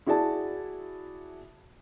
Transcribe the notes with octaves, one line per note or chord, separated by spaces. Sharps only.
E4 F#4 G#4 D5 A5